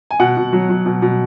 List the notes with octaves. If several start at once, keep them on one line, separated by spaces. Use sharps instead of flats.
G#5
B2 F#5
B2
F#3
F#3
B2
B2